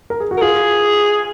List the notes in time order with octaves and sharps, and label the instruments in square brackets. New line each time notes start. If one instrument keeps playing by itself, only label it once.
[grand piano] A#4
G#4
F#4
[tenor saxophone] A#4
[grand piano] F4 [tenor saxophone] G#4